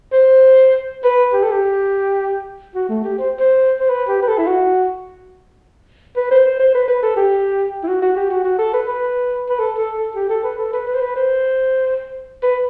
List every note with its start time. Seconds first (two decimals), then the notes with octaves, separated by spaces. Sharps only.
0.13 C5
1.04 B4
1.33 G4
1.43 A4
1.52 G4
2.75 F#4
2.89 A3
3.04 G4
3.19 C5
3.40 C5
3.80 C5
3.90 B4
4.09 G4
4.23 B4
4.28 A4
4.38 E4
4.47 F#4
6.17 B4
6.31 C5
6.46 C5
6.60 C5
6.75 B4
6.88 B4
7.03 A4
7.17 G4
7.83 E4
7.88 F#4
8.02 F#4
8.16 G4
8.31 F#4
8.44 F#4
8.59 A4
8.74 B4
8.88 B4
9.50 B4
9.59 A4
9.78 A4
9.97 A4
10.15 G4
10.30 A4
10.44 B4
10.58 A4
10.73 B4
10.87 B4
10.95 C5
11.01 B4
11.16 C5
12.43 B4